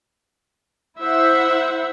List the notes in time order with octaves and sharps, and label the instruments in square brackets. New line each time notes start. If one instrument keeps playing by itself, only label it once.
[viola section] E4 C5 E5 F#5